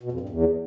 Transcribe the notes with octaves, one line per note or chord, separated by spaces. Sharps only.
B2
F2
G2
E2